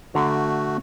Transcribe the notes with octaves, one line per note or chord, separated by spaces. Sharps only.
D3 A3 F#4 A#5